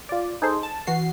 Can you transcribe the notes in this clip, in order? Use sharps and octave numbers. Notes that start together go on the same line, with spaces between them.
F4 D5
D#4 G#4 A4 C5
A5
E3 F#4 C7